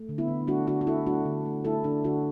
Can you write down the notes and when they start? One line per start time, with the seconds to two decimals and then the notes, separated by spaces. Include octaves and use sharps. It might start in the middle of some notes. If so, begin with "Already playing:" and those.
Already playing: A3
0.09 D3
0.18 B3 E4
0.28 D3
0.47 A3 D4 F#4
0.67 D3 D4 F#4
0.81 F#4
0.87 A3 E4 A4
1.07 A3 D4 F#4
1.26 D3
1.45 A3
1.65 A3 E4 A4
1.84 D3 D4
2.04 D3 D4 F#4